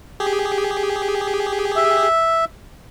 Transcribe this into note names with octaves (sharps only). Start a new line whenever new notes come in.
G4 G#4
E5